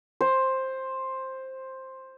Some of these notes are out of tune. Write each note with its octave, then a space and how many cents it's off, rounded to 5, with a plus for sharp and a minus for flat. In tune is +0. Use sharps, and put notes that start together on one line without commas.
C5 +10